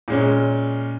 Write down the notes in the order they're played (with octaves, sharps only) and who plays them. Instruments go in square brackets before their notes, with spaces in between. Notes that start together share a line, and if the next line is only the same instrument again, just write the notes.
[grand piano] A#2 G#3 C#4